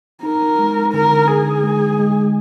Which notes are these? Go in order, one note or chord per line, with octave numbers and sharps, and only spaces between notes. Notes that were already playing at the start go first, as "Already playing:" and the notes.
D#4 A#4
G#3
D3 A#4
D3 G#4
G#3
G#3